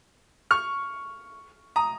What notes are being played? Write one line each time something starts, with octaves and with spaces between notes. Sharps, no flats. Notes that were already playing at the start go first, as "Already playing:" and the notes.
C#6 F6
A#5 D#6